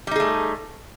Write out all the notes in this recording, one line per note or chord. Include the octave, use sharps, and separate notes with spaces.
G3 A3 D#4 G#4